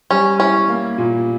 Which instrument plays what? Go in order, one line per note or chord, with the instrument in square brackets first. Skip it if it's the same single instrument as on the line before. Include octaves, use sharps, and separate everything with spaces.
[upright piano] G3 [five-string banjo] C#4
[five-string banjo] C#4 [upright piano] E4
[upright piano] A#3
A#2